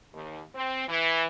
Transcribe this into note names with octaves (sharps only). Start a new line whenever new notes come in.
D#2
C4
E3